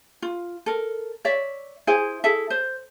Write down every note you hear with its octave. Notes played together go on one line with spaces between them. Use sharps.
F4
A4 A#4
C#5 D5 E5
E4 G#4 C5 G#5
E4 G#4 A4 E5
C5